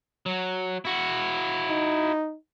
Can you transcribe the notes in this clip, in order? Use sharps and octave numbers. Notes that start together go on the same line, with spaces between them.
F#3
E4 F#4
D#4